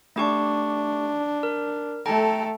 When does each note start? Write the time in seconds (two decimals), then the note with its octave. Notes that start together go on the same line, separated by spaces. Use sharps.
0.16 A3 D4 G4 C#6
1.43 A#4
2.06 A3 A4 G5 A#5